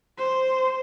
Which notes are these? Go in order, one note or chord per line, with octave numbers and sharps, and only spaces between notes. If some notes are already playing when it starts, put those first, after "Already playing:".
C5